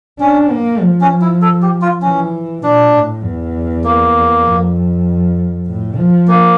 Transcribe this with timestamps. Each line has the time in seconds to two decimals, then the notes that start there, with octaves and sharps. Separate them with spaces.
0.20 C#4 D4
0.51 A#3
0.81 F3
1.01 C#4
1.22 E4
1.42 A4
1.62 G4
1.82 F4
2.02 E3 C#4
2.63 A#2 D4
2.93 A2
3.23 E2
3.84 A#3
4.46 F2
5.66 A2
5.97 F3
6.28 A#3